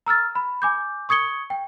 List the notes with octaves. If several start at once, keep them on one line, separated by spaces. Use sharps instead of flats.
A#5 E6 F6 A6
B5
G#5 D6 G6
C#6 D#6 G#6 C#7 G7
G5